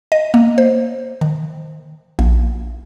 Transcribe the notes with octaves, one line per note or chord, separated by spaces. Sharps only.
D#5
A#3
C5
D#3
A#1